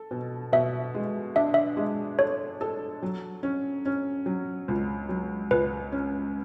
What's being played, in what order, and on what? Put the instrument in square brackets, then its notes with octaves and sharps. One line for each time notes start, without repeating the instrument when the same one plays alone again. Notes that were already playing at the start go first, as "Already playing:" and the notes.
Already playing: [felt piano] A4
B2
[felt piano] B2 [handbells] E5
[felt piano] G#3
[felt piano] D4 [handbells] E5
[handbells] E5
[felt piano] G#3
[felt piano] A4 [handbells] C#5
[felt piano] A4
F#3
C#4
C#4
F#3
C#2
F#3
[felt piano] C#2 [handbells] B4
[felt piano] C#4